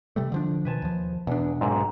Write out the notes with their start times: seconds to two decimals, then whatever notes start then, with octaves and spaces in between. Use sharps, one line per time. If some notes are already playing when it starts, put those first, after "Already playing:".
0.16 C3 G3 A3
0.32 D3 F3 D4
0.65 B2 D#3 F3 B4 G#5 A5
0.82 D#2 F3
1.27 E2 B2 D4
1.61 B1 G#2 C3